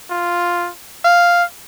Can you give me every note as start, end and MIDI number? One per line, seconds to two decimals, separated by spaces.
0.10 0.70 65
1.05 1.44 77